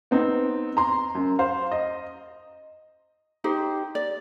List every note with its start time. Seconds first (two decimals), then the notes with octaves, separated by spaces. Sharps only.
0.11 B3 C4 D#4
0.77 A#5 C6
1.15 F#2
1.39 C5 F5
1.72 D#5
3.44 D#4 G4 C5
3.95 D5